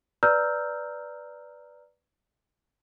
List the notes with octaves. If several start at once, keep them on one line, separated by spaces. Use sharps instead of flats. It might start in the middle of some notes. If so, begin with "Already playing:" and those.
B4 D5 A#5 E6 F6 G6